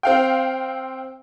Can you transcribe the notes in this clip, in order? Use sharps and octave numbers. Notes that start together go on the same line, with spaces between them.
C4 F5 G5